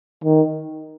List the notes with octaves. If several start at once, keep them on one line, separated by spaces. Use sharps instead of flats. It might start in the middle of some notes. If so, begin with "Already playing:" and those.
D#3